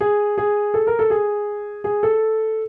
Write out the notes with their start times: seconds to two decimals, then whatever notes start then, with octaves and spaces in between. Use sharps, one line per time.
0.01 G#4
0.38 G#4
0.74 A4
0.87 A#4
0.99 A4
1.10 G#4
1.84 G#4
2.03 A4